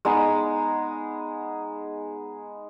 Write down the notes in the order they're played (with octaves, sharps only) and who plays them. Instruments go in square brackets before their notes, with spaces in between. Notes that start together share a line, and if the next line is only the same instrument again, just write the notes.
[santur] G#3 B3 D#4 G#4